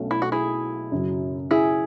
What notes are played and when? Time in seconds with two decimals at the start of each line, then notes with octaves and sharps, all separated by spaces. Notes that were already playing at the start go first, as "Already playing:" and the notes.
Already playing: B1 B2 A3 C#4
0.11 E4
0.22 F#4
0.32 E4 G#4
0.92 F#2 C#3 F#3
1.51 E4 G#4